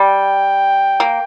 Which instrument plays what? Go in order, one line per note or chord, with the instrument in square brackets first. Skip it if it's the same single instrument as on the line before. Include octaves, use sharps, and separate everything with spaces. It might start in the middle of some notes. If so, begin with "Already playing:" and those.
Already playing: [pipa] G3 [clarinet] G5
[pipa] A#3